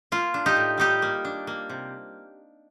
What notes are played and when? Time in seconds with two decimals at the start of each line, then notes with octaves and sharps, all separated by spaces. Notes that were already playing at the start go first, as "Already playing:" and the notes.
0.12 A#3 F4
0.34 D4
0.46 D#4 G4
0.57 A2
0.78 G3 D#4 G4
1.02 A#3
1.25 D4
1.47 A#3
1.69 C3